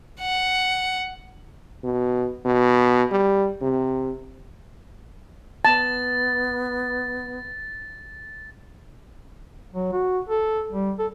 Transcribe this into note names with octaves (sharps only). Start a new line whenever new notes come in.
F#5
B2
B2
G3
C3
B3 A5 A6
F#3
F#4
A4
G3
A4